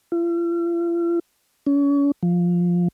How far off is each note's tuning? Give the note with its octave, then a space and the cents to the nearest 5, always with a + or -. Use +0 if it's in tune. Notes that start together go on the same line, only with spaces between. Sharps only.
F4 -45
C#4 +35
F3 +5